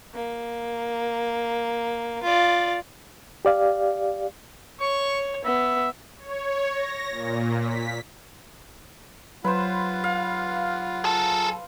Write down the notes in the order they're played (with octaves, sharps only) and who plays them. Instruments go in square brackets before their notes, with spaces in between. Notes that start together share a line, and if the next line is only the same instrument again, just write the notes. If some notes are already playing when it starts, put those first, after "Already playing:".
[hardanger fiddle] A#3
F4 D5
[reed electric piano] G4 D5 F5
[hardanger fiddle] C#5 [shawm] C#6
[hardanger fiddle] B3 [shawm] E5
[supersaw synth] C#5
A#6
A#2
B6
[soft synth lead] F#3 [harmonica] F4 F#5 [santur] B4 C5
[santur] F5
[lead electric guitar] G#4 A4